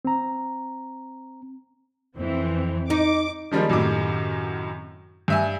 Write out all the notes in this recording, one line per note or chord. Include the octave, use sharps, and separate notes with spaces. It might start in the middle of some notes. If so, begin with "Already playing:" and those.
C4 A#5
F2 E3 C4
D#4 D6
D#3 F3 G3 G#3 A#3
F#2 A2 C3 D#3 D6
G2 E5 G#5